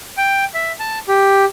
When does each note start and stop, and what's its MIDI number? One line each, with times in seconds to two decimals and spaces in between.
0.17 0.44 79
0.54 0.72 76
0.80 0.99 81
1.08 1.45 67